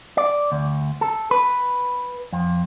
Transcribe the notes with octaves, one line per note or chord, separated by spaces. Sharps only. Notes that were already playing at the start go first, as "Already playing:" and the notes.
D5
D2
A4
B4
F2